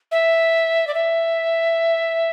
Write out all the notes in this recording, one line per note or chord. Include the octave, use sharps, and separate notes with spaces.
E5
D5
E5